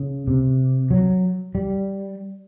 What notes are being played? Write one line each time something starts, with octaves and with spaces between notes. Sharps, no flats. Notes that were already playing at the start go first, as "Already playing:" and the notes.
Already playing: C#3
C3
F#3
G3